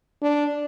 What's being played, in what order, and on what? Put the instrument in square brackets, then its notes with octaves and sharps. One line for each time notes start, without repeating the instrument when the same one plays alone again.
[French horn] D4